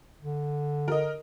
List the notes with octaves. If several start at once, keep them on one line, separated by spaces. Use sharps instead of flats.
D3
A#4 D#5